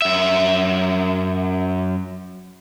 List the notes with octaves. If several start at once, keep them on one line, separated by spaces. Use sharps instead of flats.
F#2 E5